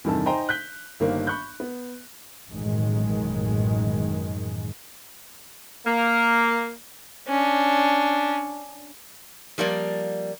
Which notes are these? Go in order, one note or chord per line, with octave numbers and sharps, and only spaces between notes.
E2 G2 C3 D#3 A4 A5
D#4 C5 G5 G#5 A#5 C6
F#6 G6 B6 G7
G1 D#3 G3 A#3 C5
B5 C#6 F#6 G6
B3
A1 F#2 B2 D#3 G#3
A#3
C#4 D4
F3 G3 A#3 D5